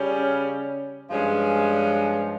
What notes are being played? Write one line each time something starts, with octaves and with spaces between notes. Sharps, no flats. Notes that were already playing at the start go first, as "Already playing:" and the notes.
Already playing: C#3 G3 C#4
G2 F3 G#3 C#4